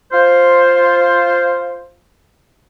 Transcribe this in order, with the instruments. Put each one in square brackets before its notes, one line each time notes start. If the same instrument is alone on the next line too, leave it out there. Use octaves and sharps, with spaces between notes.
[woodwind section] F4 C5